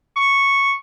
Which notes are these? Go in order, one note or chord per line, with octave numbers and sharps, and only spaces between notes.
C#6